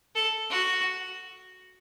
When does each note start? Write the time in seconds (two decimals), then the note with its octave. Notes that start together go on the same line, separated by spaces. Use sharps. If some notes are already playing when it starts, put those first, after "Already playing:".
0.15 A4
0.50 F#4